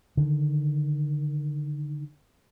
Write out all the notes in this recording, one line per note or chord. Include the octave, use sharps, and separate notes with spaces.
D3 D#3